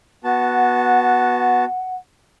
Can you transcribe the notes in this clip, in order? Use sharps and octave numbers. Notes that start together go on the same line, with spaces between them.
B3 F#4 F#5 A5